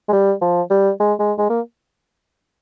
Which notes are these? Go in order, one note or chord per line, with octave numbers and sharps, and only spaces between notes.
G#3
G3
F3
G3
G#3
G#3
G#3
A#3